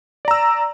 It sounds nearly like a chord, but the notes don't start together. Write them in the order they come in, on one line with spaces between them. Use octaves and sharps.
D5 A#5 E6